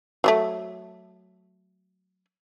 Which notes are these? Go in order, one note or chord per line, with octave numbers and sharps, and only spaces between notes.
F#3 G3 A3